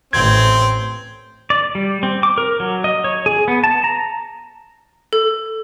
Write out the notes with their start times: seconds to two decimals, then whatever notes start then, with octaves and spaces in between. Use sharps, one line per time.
0.13 A1 C4 G#6
1.50 D5
1.75 G3
2.03 C4
2.23 D6
2.38 A#4
2.60 F#3
2.84 D#5
3.04 C#5
3.26 G#4
3.48 B3
3.64 A5
3.84 A#5
5.13 A4